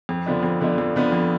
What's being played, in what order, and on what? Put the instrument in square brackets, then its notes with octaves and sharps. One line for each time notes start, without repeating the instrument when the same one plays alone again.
[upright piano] F2
D3 F3 B3 D4
F2
D3 F3 B3 D4
F2
D3 F3 B3 D4
F2